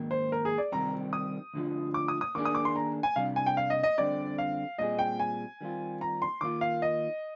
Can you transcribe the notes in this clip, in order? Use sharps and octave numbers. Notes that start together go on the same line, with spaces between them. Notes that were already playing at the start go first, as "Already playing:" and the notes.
Already playing: G#2 D#3 A#3
C5
A#4
G#4
D5
C2 C3 D#3 G3 C4 A#5
D#6
D2 D3 F3
D6
D#6
D#6
D#3 A#3 D4 G#4 D6
D#6
D6
C6
A#5
G#5
C2 C3 G3 D4 F5
G#5
G5
F5
D#5
D#5
F2 D3 G3 C4 G4 D5
F5
A#2 G3 C4 F4 G#4 D#5
G5
G#5
D#3 G3 C4 F4
A#5
C6
D#3 A#3 F4 D6
F5
D#5